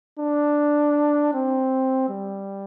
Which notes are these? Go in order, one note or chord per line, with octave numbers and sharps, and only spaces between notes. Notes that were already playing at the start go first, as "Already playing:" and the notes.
D4
C4
G3